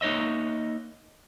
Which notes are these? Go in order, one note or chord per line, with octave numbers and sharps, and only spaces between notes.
A#3 D#4 C#5 D#5 E5